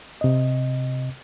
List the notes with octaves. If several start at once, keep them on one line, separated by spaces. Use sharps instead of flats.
C3 D#5